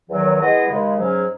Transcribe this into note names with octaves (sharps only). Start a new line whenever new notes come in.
E2 D#3 F#3
G#3 B3 E4 G#4 D#5
D#2 C#3 G#3
G#2 F#3 C#4 G#4